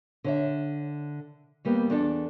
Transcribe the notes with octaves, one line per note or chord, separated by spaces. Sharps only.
D3 C#5 E5
D#2 G3 A#3 B3
E2 D4 A4